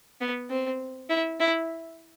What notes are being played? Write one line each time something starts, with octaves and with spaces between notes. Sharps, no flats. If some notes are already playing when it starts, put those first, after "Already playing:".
B3
C4
E4
E4